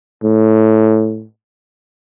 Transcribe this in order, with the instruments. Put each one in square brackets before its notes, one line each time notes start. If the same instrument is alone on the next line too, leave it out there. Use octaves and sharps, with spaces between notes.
[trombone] A2